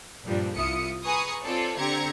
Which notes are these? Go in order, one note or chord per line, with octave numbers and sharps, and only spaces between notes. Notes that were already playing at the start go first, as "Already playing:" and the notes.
G2 A#2 F3 G3 D4
C2 E4 F4 D#6 C#7
G#4 B4 G#5 A#5 C#6 D#6
C4 F4 A4 C#5 D5
D3 C4 G4 A#5 G#6 C#7